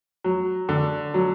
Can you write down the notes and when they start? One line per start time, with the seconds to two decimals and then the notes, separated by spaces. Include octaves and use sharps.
0.24 F#3
0.69 D3
1.14 F#3